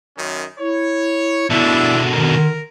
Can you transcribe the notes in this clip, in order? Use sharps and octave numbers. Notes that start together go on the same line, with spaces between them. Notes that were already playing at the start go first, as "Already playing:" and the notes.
F#2 D#3 C#4
E4 C#5
B2 D3 D4 E4 E5
D#3 A#4